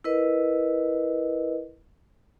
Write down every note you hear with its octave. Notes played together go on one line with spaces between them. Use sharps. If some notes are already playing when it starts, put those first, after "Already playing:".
E4 A#4 B4 D#5